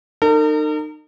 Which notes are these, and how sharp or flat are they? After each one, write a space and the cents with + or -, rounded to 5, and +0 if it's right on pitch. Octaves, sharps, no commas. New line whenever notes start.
D#4 -30 A#4 -45